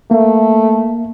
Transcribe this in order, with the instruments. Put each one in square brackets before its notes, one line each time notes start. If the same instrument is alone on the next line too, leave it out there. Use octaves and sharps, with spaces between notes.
[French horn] A3 [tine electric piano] A#3